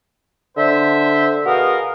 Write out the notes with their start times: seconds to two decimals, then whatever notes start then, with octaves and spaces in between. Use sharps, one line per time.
0.57 D3 C5 E5
1.46 B2 F#4 G#4 A#4 D#5 F5